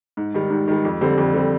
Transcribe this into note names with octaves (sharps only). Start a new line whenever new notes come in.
G#2
D#3 G3
G#2
D#3 G3
F2
D3 G3 C4
F2
D3 G3 C4